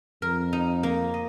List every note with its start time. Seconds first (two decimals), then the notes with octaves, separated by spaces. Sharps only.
0.22 F2 A#4
0.53 D#4
0.83 A#3
1.14 D#5